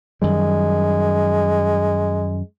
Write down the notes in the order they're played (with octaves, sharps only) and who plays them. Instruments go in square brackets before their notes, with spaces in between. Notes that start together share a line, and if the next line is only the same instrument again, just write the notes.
[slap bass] F#2 D#3 G3 [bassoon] G#3